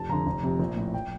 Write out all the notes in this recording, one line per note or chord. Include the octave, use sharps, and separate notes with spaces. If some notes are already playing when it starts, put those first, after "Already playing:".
Already playing: F1 A5
F2 D3 A#5
F1
F2 C3
A#1
A2
G5